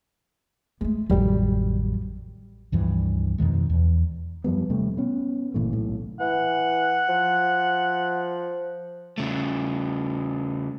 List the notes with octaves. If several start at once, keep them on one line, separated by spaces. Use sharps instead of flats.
G#3 A3 B3
A1 F2 D#3 F#3 G3
C#2 G2 E3 F3
F2 B2 D#3 G#3
E2
F#2 F3 G3 B3
D#1 C3 G3 A3
B3 C#4
G1 A#2 E3 A3
B1 A2
E3 F#5
F3
C#3 A3